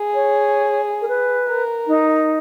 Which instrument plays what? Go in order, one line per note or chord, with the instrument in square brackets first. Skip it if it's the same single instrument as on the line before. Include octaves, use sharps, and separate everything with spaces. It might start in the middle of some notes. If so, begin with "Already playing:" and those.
Already playing: [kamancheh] G#4
[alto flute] C#5
A#4
B4
[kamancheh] A#4
[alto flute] D#4